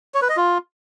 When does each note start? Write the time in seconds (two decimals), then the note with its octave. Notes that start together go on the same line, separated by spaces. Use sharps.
0.14 C#5
0.22 B4
0.29 D#5
0.37 F4